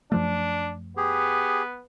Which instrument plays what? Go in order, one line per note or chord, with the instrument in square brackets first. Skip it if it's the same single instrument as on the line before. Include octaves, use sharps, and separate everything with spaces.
[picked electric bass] F#2 F3 A3 [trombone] D4
[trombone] B3 [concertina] G4 G#4